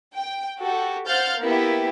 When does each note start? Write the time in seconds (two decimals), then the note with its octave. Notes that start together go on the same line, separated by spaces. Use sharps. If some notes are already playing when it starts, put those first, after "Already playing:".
0.14 G5
0.60 F#4 G4 A4
1.07 C5 F5 F#5 F6 G6 A6
1.41 A#3 B3 E4 G4